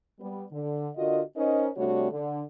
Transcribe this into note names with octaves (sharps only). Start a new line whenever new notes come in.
G3 B3
D3
D3 F4 F#4 A#4 D#5
C#4 D#4 A#4 C5 D#5
C3 G3 A3 D4 F#4 C#5
D3